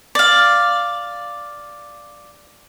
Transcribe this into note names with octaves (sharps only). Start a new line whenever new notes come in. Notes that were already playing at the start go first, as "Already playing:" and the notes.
D5 F5